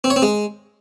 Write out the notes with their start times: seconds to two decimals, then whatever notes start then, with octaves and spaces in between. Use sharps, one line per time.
0.04 C4
0.10 C#5
0.16 C4
0.22 G#3